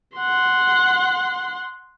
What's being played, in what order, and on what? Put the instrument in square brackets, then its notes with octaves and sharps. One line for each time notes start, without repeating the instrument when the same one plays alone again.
[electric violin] F#5 C6